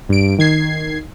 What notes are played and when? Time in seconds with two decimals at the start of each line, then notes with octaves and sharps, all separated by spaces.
0.09 G2 D7
0.39 D#3 G#6 C7